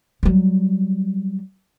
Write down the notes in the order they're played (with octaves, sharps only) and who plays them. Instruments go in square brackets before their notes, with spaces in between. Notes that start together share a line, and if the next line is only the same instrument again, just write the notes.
[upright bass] F#3 G3